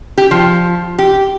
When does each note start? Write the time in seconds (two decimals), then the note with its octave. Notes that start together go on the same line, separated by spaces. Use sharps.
0.18 G4
0.31 F3
0.99 G4